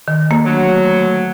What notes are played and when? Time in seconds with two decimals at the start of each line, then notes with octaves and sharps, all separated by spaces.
0.08 D#3
0.31 A#3
0.46 D2 F#3